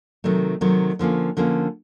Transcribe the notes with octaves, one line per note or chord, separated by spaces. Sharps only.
C3 D#3 F#3 A3
C3 D#3 F#3 A3
D3 F3 A#3 C#4
D3 F3 A#3 C#4